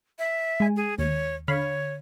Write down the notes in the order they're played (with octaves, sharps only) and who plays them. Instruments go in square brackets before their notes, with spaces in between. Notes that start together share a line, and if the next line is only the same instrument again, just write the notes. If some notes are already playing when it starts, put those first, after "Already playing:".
[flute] E5
[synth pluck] G#3 G#5
[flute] G#4
[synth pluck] D#2 [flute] C#5
[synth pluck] D3 F5 B5 [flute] C#5